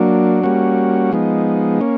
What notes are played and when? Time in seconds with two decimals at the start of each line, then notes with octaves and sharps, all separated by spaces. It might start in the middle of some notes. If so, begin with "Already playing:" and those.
Already playing: F#3 A#3 D4
0.43 G3 A#3 C#4 F#4
1.12 F3 G#3 B3 D#4
1.81 A#3 C#4